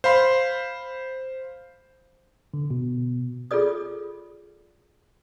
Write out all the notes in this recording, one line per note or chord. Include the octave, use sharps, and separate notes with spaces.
C5 F5 B5 C6
D3
B2
F4 G#4 A4 D5 D#6